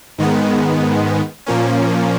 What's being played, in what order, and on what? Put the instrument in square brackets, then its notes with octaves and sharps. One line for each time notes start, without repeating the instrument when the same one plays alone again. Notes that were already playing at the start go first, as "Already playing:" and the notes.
[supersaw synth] G#2 D#3 G#3 B3
A#2 F3 A#3 C#4